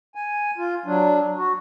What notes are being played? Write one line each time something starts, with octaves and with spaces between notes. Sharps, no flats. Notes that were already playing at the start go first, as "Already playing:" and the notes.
G#5
F4
F#3 D4
F#4